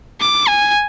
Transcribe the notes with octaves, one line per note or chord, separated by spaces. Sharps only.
D6
G#5